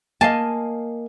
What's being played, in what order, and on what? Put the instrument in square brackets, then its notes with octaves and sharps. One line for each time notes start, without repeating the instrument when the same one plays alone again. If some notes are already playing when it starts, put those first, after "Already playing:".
[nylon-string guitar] A#3 [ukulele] D#5 F5 G#5 [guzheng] A5